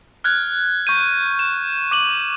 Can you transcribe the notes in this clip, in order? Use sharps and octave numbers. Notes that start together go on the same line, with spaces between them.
F6 F#6 G#6
C#6 G6 D#7
E7
D6 D#7 F#7